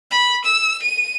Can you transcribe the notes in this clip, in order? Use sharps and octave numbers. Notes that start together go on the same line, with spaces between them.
B5
E6
D#7